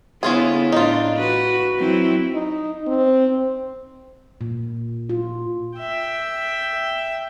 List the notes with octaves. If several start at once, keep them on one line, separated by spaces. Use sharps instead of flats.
D3 B3 C#4 E4 F4 G#4
A2 D4 D#4 F4
F#4 B4
F#3 C4 E4
D#4
C4
A#2
F4
E5 G5